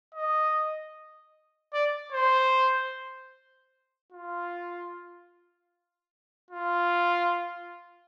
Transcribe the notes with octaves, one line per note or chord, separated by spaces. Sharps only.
D#5
D5
C5
F4
F4